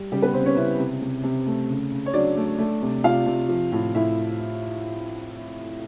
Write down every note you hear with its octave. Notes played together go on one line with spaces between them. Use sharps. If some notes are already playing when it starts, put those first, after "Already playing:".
Already playing: G3
C#3 G3 G4
B3 B4
C#3 C4 C5
C#4 C#5
C#3 E4 E5
C3
C3
C3
A3
C#3
C#3
C#5
F#3 D4 D5
A3
A3
C3
C3 F4 F5
C3
F3
A2
A2 E4 E5